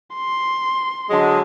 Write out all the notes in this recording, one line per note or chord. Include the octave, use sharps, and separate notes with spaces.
C6
D3 F#3 G#3